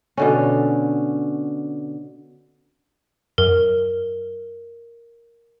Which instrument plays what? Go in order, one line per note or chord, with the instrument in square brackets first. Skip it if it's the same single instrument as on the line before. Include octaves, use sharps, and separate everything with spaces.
[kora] B2 D3 C#4
[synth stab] F#2 [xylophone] A#4